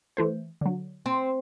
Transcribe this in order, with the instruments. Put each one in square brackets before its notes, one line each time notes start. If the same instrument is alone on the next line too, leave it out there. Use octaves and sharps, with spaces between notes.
[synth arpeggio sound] E3 A3 C5
D3 F#3
[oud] C4